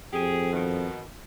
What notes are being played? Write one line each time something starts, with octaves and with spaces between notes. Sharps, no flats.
F2 G4 G#4
B2 D#3